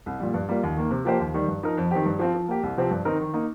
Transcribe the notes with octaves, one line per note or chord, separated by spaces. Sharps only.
C2
A#2 G3
G2
G3 A#3 F4
D#2
D#3 A#3
C3
F3 A#3 G4 C5
D#2
D#3 G3
G2
F3 D#4 A#4
F2
D#3 C4 G4
G2
F3 C4 F4
F3
A#3 G4
C2
C3 F3 C4 G4
G2
D#3 C4 D#4 A#4
D#3
A#3 D#4